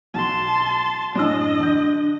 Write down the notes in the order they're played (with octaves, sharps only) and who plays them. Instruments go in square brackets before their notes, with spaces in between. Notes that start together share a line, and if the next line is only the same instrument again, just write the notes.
[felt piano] B1 F#4 [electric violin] A5 C6
[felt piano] F#2 A2 E6 [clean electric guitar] D4 [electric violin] D#5
[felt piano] D3 G6